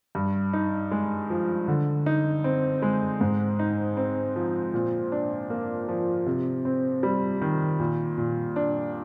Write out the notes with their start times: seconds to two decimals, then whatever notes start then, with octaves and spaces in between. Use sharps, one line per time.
0.15 G2
0.53 D#4
0.91 G#3
1.30 F3
1.68 D3
2.06 D#4
2.44 C4
2.82 G#3
3.21 G#2
3.59 D#4
3.97 C4
4.36 F3
4.74 A#2
5.12 D4
5.50 A#3
5.88 F3
6.26 C3
6.65 C4
7.03 G3
7.42 D#3
7.80 A#2
8.18 A#2
8.56 D4